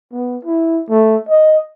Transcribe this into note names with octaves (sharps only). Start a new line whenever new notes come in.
B3
E4
A3
D#5